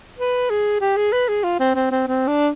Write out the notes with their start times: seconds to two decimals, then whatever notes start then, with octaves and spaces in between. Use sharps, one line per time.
0.18 B4
0.50 G#4
0.81 G4
0.97 G#4
1.13 B4
1.28 G#4
1.44 F4
1.60 C4
1.75 C4
1.91 C4
2.07 C4
2.27 D4